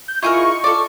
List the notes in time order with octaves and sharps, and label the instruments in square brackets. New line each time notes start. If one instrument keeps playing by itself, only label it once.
[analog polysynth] G6
[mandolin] E4 G#4 A#4 [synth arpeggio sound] F4 D#5 F5 [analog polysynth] C#6
[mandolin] A4 D5